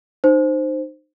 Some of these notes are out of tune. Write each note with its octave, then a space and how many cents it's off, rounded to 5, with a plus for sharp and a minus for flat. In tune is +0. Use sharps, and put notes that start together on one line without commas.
D#4 -30 C5 +0